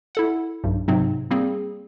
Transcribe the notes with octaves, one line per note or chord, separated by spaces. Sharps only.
E4 A4 F#5
B1 G2
G#2 C3 F#3 C4
G3 A#3 C4 G#4